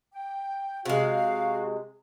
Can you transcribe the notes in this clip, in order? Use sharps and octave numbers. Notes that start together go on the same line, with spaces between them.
G5
C3 G#3 F#4 F5